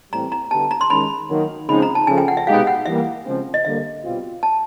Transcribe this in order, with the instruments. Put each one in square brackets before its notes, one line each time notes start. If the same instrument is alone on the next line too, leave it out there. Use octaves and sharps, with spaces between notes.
[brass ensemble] A2 E3 G3 C4 [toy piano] A#5
[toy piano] A#5
[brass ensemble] D3 G3 B3 E4 G4 [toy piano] A5
[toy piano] A#5
C6
[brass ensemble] D#3 G#3 C#4 [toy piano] B5
[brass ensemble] D#3 F#3 A#3
[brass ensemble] C#3 F3 G#3 C4 D#4 [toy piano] B5
[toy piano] A#5
A5
[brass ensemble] C#3 F3 A3 [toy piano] G#5
[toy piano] G5
F#5
E5
[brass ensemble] B2 G#3 B3 D#4 G4 [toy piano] F5
[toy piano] F#5
[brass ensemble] E3 G3 A#3 [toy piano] E5
[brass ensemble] C#3 F3 G#3 C4
[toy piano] D#5
[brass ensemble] D3 G3 A#3 [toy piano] E5
[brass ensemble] B2 G3 C4 F4
[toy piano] A5